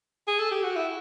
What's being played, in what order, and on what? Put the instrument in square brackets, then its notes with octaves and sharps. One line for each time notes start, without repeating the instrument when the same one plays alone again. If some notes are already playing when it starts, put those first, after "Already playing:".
[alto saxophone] G#4
A4
G4
F#4
E4